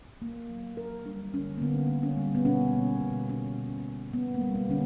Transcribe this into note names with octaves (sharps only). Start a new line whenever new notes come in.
A#3
F#3
A#3 A#4
G3 D4
D3 C#4
A#3
D3 B3
A#3
C#4
G3
B3
B2 C#4
A#3
B2
A#3 C#4
B2
A#3
A#3 B3
A#3
G3
B3
D3 C#4